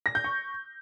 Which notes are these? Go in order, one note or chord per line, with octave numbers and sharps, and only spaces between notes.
A#6
G6
C#6